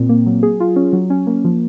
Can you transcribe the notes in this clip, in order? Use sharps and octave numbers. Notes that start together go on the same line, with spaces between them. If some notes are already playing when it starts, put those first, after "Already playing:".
Already playing: A#2 C4
A#3
F#3
G#4
F4
C#4
F#3
C#4
A#3
F3